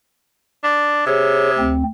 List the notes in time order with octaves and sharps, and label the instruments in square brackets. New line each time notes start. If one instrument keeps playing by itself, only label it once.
[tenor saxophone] D4
[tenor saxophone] C3 [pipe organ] G#4 C#5
[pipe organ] D2 C4